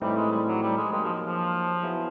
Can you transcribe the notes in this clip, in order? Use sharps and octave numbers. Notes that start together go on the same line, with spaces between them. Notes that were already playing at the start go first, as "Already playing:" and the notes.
A2 E3 G3 A3 C4 D#4
G#3
G3
F#3
G3
G#3
F#3 G#3 A#3 D#4 G4
F3
F3
F#3 B3 E4 G#4